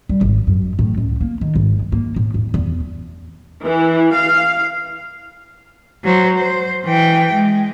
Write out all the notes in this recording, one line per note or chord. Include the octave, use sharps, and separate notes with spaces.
G3
G#1
F#2
A2
C#2
A#3
D#3
G#1
A#3
A2
E2
E2
E3
F5
F#3 C5
C5
E3 G5
G#3